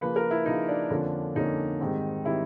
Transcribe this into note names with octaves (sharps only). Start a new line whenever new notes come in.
C#3 F3 A#3 B4
A#4
E4
C#3 F3 A#3 D#4
D4
F2 D3 F3 A#3 C#4
F2 D3 F3 A#3 C#4 D#4
G#2 D#3 G3 C4
D#3 G3 C4 E4